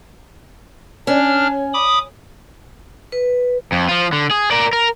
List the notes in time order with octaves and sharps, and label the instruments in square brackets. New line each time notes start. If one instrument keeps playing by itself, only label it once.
[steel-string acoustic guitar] C#4 [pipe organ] D4 F6
[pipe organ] B5 D6 D#6
[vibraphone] B4
[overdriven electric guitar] F2
F3 F4
D3
G#4
A#4 D5
A#4